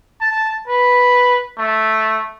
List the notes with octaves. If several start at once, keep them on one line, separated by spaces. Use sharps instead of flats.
A5
B4
A3